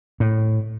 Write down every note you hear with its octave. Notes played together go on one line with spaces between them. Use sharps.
A2